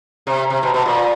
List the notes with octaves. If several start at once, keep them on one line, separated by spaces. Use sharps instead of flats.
C3
C3
B2
B2
A#2